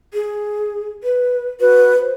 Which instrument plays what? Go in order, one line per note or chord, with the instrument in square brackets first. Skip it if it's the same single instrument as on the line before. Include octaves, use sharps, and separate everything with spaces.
[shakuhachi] G#4
B4
[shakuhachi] F#4 [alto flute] B4
[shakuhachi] C5